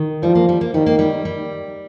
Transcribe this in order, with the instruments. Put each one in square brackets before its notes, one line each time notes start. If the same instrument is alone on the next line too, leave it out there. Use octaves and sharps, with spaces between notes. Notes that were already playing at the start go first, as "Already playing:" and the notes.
Already playing: [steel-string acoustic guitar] D#3
[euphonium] F3 [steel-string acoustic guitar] G3
[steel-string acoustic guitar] A#3
G3
A#3
[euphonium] D#3 [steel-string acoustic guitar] G3
[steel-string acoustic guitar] A#3
G3
G3